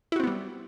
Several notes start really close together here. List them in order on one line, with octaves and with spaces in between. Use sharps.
E4 F#4 C4 B3 G3